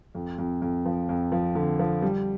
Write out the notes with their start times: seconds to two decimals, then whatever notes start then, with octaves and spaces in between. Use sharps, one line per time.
0.15 F2
0.38 F2
0.62 F2
0.86 F3
1.09 F2
1.32 F3
1.55 D3
1.79 F3
2.02 G3